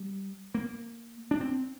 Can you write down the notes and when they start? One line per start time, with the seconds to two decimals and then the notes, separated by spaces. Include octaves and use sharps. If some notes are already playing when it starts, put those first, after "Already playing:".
Already playing: G3
0.54 A#3
1.31 D4
1.40 C4